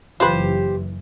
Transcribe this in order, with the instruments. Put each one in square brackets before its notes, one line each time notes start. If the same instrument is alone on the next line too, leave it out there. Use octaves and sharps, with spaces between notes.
[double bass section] F#1 E3 [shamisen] F4 B4 [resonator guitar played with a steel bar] G4 C5